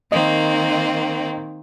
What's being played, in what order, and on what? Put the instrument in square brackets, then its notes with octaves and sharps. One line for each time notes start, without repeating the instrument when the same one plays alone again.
[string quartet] D#3 A#3 C4 [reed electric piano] D#5